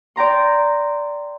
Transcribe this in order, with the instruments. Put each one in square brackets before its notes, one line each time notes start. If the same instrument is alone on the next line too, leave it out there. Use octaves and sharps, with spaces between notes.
[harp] D5 G5 A#5 C6